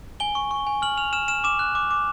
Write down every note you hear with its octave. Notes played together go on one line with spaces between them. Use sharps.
G#5 G7
C#6
C#6
G#5
F6 F#7
F6 F7
F6 E7
F6 E7
D6 E7
F#6
D6
D6